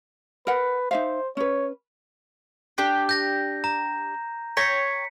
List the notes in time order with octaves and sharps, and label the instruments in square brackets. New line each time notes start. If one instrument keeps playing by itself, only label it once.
[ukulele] A#4 F#5 [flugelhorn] B4
[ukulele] D#4 E5 F5 [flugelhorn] C5
[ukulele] C#4 B4 [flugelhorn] C#5
[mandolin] D4 G4
[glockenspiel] G6 A#6
A#5
[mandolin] C#5 G5 A#5 [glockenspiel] B6 C#7